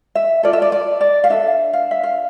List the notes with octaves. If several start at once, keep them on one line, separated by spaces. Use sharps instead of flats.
E5
F4 A4 D5
E5
D5
D5
D5
F5
D4 A4 E5
F5
E5
F5